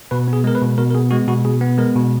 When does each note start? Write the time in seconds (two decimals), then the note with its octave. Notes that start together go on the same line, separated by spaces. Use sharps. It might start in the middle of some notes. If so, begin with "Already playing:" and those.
0.11 B2 B4
0.28 B3
0.33 G#4
0.44 G#3 A#4
0.55 B4
0.62 B2
0.78 B2 A#4
0.91 A#4
0.95 B3 G#4
1.11 G#3 F#4
1.28 B2 F#4
1.45 B2 G#4
1.61 B3
1.78 G#3 A#4
1.95 B2